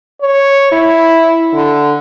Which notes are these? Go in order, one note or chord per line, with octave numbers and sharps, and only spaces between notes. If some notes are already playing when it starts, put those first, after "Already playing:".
C#5
E4
D3